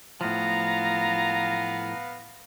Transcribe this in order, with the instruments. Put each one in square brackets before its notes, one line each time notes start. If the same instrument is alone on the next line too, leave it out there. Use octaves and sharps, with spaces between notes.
[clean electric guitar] A2 F3 [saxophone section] B3 F5 [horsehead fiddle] A#5